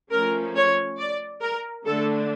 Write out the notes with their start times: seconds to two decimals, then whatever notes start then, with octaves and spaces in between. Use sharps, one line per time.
0.11 F3 A3 C#4 A#4
0.55 C#5
0.98 D5
1.41 A#4
1.86 D3 A3 D4 A4